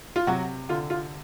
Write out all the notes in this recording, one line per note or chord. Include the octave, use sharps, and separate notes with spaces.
F4
C3 F#3 F#4
D3 F4
F4